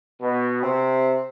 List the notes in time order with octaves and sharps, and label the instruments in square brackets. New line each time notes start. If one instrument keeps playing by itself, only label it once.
[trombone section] B2 B3
[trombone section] C3 [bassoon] C4